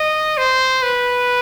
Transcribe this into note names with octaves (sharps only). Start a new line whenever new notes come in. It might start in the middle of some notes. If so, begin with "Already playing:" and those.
Already playing: D#5
C5
B4